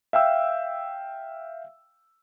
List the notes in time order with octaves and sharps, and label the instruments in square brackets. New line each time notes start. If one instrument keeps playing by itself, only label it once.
[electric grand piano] E5 F5 G5 E6